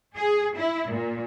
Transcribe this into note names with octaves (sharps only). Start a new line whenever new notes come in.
G#4
E4
A#2